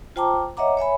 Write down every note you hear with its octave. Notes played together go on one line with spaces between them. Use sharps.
F4 C5 G5 A5 A#5 D6
C#5 D#5 E5 F#5 A#5 D6
C#5 E5 G#5 B5